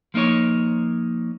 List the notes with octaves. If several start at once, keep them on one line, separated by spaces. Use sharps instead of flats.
F3 A#3 D#4 C#5